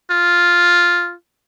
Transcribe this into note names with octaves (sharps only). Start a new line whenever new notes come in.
F4